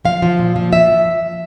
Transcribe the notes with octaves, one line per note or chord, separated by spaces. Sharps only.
F3 F5
F3
A#2
F3
F3 E5